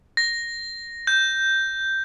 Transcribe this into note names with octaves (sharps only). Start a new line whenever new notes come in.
A#6
G6